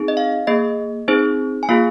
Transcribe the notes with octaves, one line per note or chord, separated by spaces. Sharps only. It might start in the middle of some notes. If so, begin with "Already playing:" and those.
Already playing: C4 D#4 G#4
D#5
F5
A#3 G#4 D#5
C4 D#4 G#4 C5
G#5
A#3 F4 G#4 F5